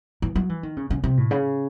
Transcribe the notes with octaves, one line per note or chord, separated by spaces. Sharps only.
E3
F#3
E3
D#3
C#3
C#3
C3
A2
C#3